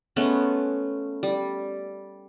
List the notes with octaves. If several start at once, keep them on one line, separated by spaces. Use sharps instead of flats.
G#3 A3 B3 C#4
G3